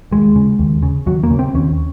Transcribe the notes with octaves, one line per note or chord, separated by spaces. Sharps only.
D#2 G#3
C#3
D#2
C#3
D#2 F#3
A#3
C#3
C4
D#2 C#4